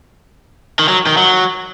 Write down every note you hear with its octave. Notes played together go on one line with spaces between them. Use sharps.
D#3
F#3
D#3
F#3